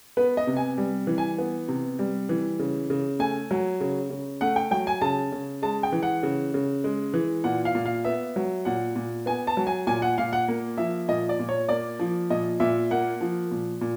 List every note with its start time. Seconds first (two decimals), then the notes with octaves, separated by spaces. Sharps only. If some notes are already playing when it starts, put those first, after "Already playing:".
0.17 B3 B4
0.37 D#5
0.47 C3
0.57 G#5
0.78 G3
1.07 E3
1.18 G#5
1.38 B3
1.68 C3
1.99 G3
2.29 E3
2.59 C#3
2.90 C#3
3.19 A3 G#5
3.51 F#3
3.81 C#3
4.10 C#3
4.41 A3 F#5
4.56 G5
4.71 F#3 G5
4.87 G#5
5.01 C#3 A5
5.32 C#3
5.62 G#3 A5
5.83 G5
5.92 E3
6.03 F#5
6.23 C#3
6.54 C#3
6.84 G#3
7.14 E3
7.44 A#2 F#5
7.65 F5
7.75 A#2
7.86 F5
8.05 B3 E5
8.36 F#3
8.65 A#2 F#5
8.96 A#2
9.26 B3 G#5
9.47 A5
9.57 F#3
9.67 G#5
9.87 A#2 G#5
10.02 F#5
10.18 A#2 F5
10.33 F#5
10.48 A#3
10.78 F3 E5
11.08 A#2 D#5
11.29 D5
11.39 A#2
11.49 C#5
11.69 A#3 D5
11.99 F3
12.30 A#2 D#5
12.60 A#2 E5
12.91 A#3 F#5
13.21 F3
13.51 A#2
13.81 A#2